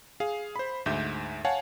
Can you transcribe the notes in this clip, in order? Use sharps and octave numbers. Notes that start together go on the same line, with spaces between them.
G#4 F5
C5 B5
D2 G#2 E5 G6
C#5 F5 F#5 G#5 A5